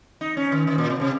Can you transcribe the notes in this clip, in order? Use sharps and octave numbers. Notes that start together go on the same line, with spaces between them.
D#4
C#4
D#3
D#3
A#2
C3
C3